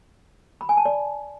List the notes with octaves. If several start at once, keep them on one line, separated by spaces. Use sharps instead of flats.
B5
G#5
A5
D5